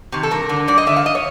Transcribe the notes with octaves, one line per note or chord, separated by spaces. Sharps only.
C3 D#3
A4
G2 A#4
D3
G2 D5
D#5
D3 E5
F5
D#5
C#5